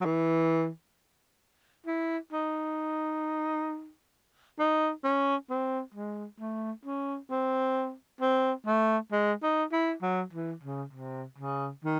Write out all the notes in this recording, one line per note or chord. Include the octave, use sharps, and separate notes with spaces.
F#3
E3
E4
D#4
D#4
C#4
C4
G#3
A3
C#4
C4
C4
A3
G#3
D#4
E4
F#3
E3
C#3
C3
C#3
D#3